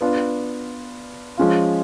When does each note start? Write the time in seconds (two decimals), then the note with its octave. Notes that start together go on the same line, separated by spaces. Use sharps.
0.01 B3 D4 F4
1.37 F3 G#3 C#4 F4